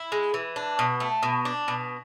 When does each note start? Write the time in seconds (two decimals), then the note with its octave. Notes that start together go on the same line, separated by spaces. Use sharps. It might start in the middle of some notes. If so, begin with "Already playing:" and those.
Already playing: E4
0.12 G#3
0.34 E3
0.56 D4
0.79 B2
1.00 A3
1.23 B2
1.45 D4
1.68 B2